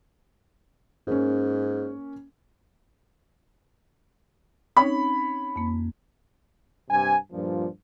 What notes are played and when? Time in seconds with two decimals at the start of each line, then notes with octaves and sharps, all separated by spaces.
1.07 G#2 A#3 C#4
4.77 C4 C#4 D#4 C#5 B5
5.56 F2 A#3
6.91 G2 C3 G#5
7.32 G2 A#2 F3